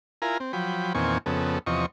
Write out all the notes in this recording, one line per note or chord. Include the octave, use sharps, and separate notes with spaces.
E4 F4 A#4 G#5 A#5
C4
F3 F#3 G5 B5
E2 A#2 D#3 C4 G#5 C#6
F2 C#3 B3 A4
E2 C3 F3 D#5 C#6